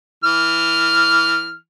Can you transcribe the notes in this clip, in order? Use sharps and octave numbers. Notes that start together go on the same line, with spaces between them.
E3 F6